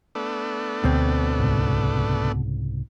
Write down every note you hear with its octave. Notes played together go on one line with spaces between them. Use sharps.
A3 B3 D4
D2 B2 C4
C2 G#2 C#3